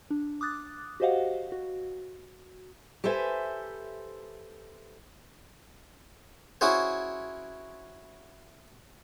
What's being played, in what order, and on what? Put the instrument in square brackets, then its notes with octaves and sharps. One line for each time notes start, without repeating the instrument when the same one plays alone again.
[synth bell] D4
D6 D#6 F#6 A6
F#4 G4 C5 D#5 F5 F#5
F#4
[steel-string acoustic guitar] G4 A4 B4 C5 E5 G#5
[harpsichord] C#4 E4 F#4 G#4 C5